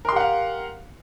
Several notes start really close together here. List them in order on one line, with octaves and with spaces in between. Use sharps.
A#4 C6 G4 F#5 F5